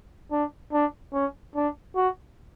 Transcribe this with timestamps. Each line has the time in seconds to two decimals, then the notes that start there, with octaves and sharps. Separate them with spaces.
0.32 D4
0.73 D4
1.13 C#4
1.55 D4
1.96 F#4